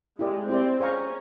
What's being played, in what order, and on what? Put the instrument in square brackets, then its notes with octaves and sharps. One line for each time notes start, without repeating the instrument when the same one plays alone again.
[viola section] G#3 [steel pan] E4 G4 A#4 D5
[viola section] C4 [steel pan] E4 G4 A#4 D5
[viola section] C#4 [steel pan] G#4 C5 F5 A#5 C#6